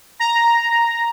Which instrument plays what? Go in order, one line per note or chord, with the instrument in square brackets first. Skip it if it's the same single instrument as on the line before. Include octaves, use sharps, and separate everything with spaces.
[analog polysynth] A#5